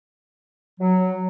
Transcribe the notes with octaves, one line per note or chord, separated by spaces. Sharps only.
F#3